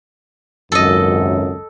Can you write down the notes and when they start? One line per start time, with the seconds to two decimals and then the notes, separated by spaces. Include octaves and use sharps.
0.72 G#1 C#2 F#2 A4 D#5